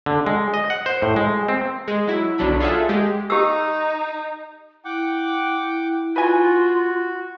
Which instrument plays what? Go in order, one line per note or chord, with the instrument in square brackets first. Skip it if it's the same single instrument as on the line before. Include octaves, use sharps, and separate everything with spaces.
[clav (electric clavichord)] D3
G#3
D#5
F#5
C5
A2
G#3
C4
[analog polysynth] G#3
F#3 E4
B1 D3 F#3 D4 B5
F4 G#4 A4 E5 F#5
G#3 G4
[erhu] D#4 [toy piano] G4 E6
[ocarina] E4 [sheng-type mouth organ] F#5 G5 D6
[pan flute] F4 [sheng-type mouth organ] F#4 [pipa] B4 G#5